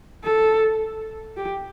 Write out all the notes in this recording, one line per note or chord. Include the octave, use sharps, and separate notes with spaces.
A4
G4